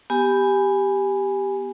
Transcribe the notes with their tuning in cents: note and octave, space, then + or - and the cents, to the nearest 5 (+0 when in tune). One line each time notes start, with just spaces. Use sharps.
B3 +5 G4 +0 G#5 -5